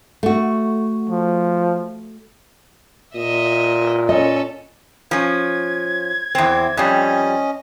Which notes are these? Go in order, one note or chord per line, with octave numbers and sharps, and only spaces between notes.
A3 F#4
F3
A#2 D#5 E5
C#4 A4 D#5
F3 C#4 G#6
E2 C4
F2 G3 C#4 D#5